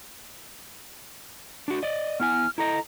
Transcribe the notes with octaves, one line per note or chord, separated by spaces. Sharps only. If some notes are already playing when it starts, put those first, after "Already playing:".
D4 F#4
D5 D#5
B3 E4 G#5 F6
E4 A4 D#5 A#5